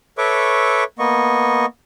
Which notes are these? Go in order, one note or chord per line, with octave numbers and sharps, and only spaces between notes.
A4 B4 C#5 E5 C#6 D6
A#3 B3 D#5 C#6